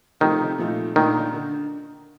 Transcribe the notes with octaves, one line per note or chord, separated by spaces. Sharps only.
C3 D#3 F3 A3 C4 G4
A#2 F3 A3 D#4
A#2 D#3 A3 D4
D3